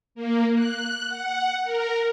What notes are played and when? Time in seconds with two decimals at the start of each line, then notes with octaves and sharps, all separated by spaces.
0.15 A#3
0.55 F#6
1.09 F#5
1.64 A#4